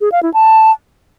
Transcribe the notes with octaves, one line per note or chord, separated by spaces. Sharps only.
G#4
F5
E4
A5